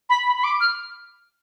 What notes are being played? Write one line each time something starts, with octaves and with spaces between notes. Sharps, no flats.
B5
B5
B5
D6
F6